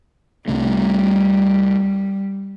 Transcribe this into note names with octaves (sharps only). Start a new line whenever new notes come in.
C2 C3 G3 A3